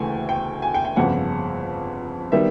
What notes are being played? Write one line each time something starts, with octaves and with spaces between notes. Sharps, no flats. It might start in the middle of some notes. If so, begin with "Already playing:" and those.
Already playing: D2 C#3 E3 A3 G5 G#5
G5
G#5
G5
G5
G1 F2 C#3 F#5
D#3 G3 B3 E5